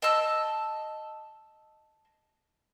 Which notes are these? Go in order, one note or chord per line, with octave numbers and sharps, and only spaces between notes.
D#5 A5 E6